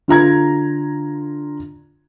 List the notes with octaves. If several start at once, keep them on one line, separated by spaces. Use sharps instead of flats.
D3 F4 A#5 G#6